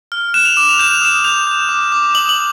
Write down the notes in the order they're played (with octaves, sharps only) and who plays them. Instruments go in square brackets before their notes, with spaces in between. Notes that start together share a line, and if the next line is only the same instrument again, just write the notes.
[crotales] F6
F#6 E7
F7
D6 E7
F7
G6 E7
F7
D#6 E7
G6 F7
G6
D6
D6
D#6 F#7
F#7